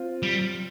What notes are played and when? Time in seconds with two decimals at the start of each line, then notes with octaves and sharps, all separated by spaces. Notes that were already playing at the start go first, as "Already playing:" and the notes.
Already playing: C4 F4
0.23 G3